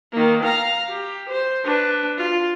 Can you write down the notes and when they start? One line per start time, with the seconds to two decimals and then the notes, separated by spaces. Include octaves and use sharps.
0.13 D#3 A#3
0.43 F5 A#5
0.89 G4
1.29 C5
1.64 D4 B4
2.18 F4